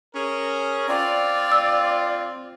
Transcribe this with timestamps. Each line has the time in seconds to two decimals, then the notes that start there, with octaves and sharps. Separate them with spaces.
0.14 C#4 G#4 A#4
0.88 C4 F4 D5
1.52 E6